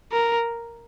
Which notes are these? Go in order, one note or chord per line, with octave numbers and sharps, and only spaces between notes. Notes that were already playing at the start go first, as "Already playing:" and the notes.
A#4